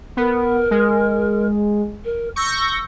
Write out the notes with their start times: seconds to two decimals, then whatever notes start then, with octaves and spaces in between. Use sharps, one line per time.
0.17 B3 A#4
0.71 G#3
2.04 A#4
2.36 C#6 E6 G6 A#6